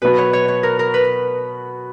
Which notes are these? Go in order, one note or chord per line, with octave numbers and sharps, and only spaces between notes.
B2 F#3 B3 F#4 B4
C#5
C#5
C#5
A#4
A#4
B4